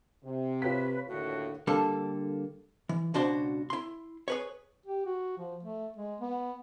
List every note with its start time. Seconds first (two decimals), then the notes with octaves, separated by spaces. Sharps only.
0.23 C3
0.62 F4 B4 C#5 B6
1.08 D#2 A2 D3 F#4
1.67 D3 G3 A#3 D4 A4
2.89 E3
3.14 C#2 B2 D4 F#4 C5 C6
3.70 E4 C6
4.28 G#4 B4 C#5
4.86 G4
5.06 F#4
5.38 F3
5.63 A3
5.97 G#3
6.21 B3